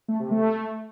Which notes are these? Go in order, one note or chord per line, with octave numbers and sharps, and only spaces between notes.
A3
C3
A3